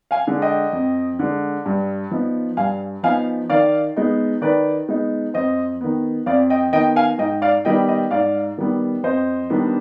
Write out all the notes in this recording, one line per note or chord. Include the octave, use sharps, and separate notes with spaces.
F5 G#5
D3 G#3
D#5 G5
F2
D3 G#3
G2
F3 B3 D#4
G2 F5 G#5
F3 B3 D#4 F5 G#5
D#3 D5 F5
G#3 B3 D#4
D#3 B4 D5
G#3 B3 D#4
F2 C5 D#5
D#3 B3
F2 D5 F5
D#5 G5
D#3 B3 D#5 G5
F5 G#5
G#2 D#5 G5
D5 F5
D#3 G3 B3 D#5 G5
D#5 G5
G#2 D5 F5
D#3 G3 B3
F2 C5 D#5
D#3 G3 B3 D4